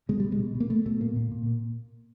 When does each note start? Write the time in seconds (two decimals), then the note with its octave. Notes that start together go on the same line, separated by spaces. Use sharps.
0.09 B2 G#3
0.20 B2 G3
0.32 G#3
0.39 B2
0.55 B2
0.60 A#3
0.70 B2 A3
0.86 B2 A3
1.00 A#2 A#3
1.16 A#2
1.31 A#2
1.46 A#2